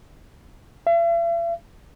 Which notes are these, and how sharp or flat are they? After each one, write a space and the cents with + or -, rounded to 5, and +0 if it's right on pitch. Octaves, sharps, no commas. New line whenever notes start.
E5 +45